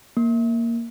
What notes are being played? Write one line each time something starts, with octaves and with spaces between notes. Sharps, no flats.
A#3